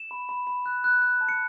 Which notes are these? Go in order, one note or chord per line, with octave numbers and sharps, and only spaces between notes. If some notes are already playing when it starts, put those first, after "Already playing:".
Already playing: E7
B5
B5
B5
F#6
F#6
F#6
A5
C#7